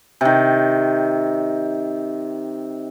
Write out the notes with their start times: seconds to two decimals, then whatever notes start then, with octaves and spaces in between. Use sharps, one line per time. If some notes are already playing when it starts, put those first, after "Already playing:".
0.21 C3 D#3